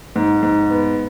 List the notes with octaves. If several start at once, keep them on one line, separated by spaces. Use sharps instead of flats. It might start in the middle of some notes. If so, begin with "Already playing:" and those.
G#2
G#2
B3